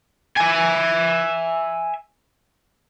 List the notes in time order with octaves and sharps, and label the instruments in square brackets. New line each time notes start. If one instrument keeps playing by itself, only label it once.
[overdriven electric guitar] E5 G#5